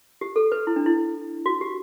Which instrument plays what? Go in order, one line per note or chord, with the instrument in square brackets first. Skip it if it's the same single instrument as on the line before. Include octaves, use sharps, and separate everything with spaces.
[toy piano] G4
A4
B4
E4
D4
E4
F#4
G4